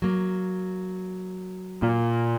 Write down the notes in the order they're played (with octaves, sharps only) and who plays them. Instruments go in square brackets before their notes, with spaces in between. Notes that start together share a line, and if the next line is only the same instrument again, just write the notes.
[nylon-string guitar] F#3 A#3
[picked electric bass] A#2